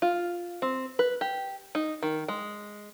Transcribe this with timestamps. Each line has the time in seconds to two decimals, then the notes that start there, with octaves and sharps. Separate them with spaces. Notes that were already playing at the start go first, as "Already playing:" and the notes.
0.02 F4
0.62 C4
0.99 B4
1.21 G4
1.75 D#4
2.03 D#3
2.28 G#3